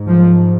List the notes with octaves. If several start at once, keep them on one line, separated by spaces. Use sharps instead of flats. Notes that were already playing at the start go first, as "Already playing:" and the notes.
Already playing: G#2
F3